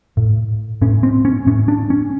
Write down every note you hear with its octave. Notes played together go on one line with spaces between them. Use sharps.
A2
A2 C#4
C4
C#4
A2 C#4
D4
C#4